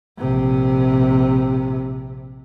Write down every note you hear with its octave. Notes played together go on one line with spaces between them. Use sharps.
A#1 C3